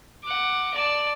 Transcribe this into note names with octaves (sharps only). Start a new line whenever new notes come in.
F#5 D6
D5 A5